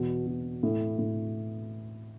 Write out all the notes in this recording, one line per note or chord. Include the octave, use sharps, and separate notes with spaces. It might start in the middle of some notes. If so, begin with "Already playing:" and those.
Already playing: E2 B2
B2
A2
A2